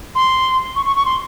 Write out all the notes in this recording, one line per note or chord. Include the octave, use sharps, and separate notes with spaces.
C6
C#6
C#6
C#6
C6